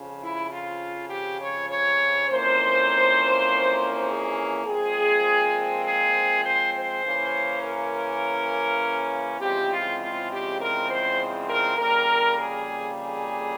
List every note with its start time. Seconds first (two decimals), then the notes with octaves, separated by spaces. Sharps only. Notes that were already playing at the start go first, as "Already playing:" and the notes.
Already playing: F2 C#3 F3
0.21 E4
0.49 F4
1.09 G4
1.39 C#5
1.68 C#5
2.28 F2 E3 A#3 C#4 C5
4.06 G#4
4.65 A#2 F3 G#3 C4 G#4
5.84 G#4
6.44 C5
6.73 C5
7.03 C#3 E3 A#3 C#4
7.61 A#4
9.39 E2 C#3 F3 G#3 C4 G4
9.69 F4
9.99 F4
10.29 G4
10.59 A#4
10.88 C5
11.47 A#4
11.77 F2 C#3 G3 A#3 A#4
12.37 G#4
12.96 G#4